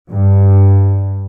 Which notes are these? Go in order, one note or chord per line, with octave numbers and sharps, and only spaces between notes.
G2